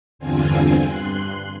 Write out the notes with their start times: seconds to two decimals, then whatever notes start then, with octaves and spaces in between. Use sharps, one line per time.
0.19 E2 G2 D3 C4 F4 G#5
0.83 G2 C6 F#6